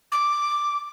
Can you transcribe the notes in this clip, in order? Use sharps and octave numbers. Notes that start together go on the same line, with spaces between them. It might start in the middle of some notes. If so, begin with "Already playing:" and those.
D6